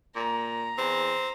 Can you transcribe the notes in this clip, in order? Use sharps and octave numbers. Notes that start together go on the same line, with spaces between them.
A#2 A#5
E2 C4